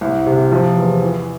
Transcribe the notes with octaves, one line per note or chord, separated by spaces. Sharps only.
C2
C3
F3
E2
E3